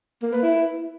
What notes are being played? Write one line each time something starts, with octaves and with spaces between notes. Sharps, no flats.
A#3
B4
E4